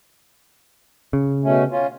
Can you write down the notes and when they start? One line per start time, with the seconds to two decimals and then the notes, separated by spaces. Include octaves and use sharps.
1.13 C#3
1.44 B2 A3 C#4
1.72 C#4 F4